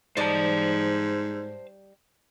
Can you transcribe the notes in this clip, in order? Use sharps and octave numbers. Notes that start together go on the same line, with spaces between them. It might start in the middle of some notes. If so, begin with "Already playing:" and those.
G#2 G3 D#4 C5 D5 A5